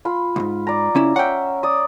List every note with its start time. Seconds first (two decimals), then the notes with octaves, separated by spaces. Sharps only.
0.05 F4 B5
0.36 C2 G#2
0.67 D5 A#5
0.95 C#3 C#4 E4
1.16 C#4 E5 F#5 G5
1.63 D5 D#6